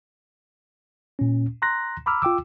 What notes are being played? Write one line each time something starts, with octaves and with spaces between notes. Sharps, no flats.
A#2 C#4
A#5 C6 F#6 A#6
A#5 B5 D6 E6 F6
F4 G5 D6 E6